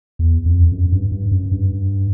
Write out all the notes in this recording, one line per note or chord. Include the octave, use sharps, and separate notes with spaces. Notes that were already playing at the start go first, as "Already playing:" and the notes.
E2
F2
F#2
G2
G2
F#2
G2